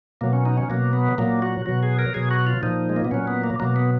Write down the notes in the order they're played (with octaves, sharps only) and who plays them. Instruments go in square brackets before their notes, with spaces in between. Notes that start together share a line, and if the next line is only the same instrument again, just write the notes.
[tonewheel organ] B2 F#3 A#3
C#4
D#4
C#4
B2 F#3 A#3
B3
A#2 F#3 A#3
F#4
B2 F#3 F#4
G#4
A#4
B2 F#3 G#4
F#4
F4
A#2 F3 D#4
G#3
A#3
B3
A#2 F#3 C#4
B3
A#3
B2 F#3 A#3
B3